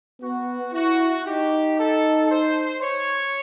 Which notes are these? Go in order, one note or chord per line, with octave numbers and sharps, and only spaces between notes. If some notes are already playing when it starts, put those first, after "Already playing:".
B3 F#4
E4 F#4
D#4 G4
A4
C5
C#5